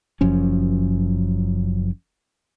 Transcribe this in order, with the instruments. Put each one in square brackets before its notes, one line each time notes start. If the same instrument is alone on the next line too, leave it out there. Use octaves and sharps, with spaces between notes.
[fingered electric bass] F#1 F#2 F3 C#4